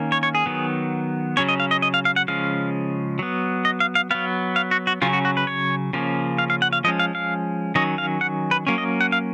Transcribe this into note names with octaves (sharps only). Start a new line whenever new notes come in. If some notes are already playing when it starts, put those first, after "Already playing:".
Already playing: D#3 A#3 C#4
C#5
C#5
G#4
D#3 F#3 B3
C#3 F#3 C#4 C#5
D#5
F5
D#5
D#5
F5
F5
F#5
C#3 F3 G#3 C#4 F5
F#3 B3
D#5
F5
F5
F#3 B3 F5
F5
F#4
F#4
C#3 F#3 C#4 F4
F#4
F#4
B4
C#5
C#3 F3 A#3 C#4
F5
F5
F#5
F5
F3 G#3 C#4 D#5
F5
F5
D#3 F#3 C#4 D#5
F5
F#5
B4
F#3 A#3 C#4
D#5
F#5
F5